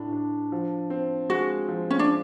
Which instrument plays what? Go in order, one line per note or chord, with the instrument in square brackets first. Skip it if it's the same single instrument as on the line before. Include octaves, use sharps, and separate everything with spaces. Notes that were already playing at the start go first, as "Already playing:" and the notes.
Already playing: [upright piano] A2 D4
D4
F3
C4
[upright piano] G#3 [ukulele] F#4
[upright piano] F3
[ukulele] C#4
D4